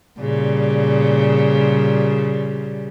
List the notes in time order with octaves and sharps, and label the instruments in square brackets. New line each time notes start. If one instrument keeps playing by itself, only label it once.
[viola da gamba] A#2 C#3 G3